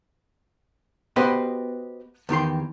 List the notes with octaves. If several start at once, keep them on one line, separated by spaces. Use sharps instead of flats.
B3 F#4 G4 B4 C5 D#5
E2 D#3 G4 C6